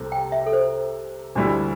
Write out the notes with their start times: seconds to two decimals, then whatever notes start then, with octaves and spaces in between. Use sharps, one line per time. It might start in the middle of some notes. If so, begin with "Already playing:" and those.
Already playing: C2 C3 A3 C4
0.12 G5
0.32 E5
0.46 A4
0.53 C5
1.35 D2 D3 G3 D4 E4